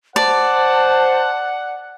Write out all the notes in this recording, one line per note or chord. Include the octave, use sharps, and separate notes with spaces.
C5 D5 F#5 A5